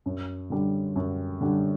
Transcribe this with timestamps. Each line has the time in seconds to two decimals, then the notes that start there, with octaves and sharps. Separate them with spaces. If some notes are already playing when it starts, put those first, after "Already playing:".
0.06 F#2
0.50 D3 G3
0.96 F#2
1.41 D3 G3